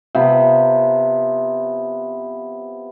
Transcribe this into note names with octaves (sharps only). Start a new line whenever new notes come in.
C3 F3 B3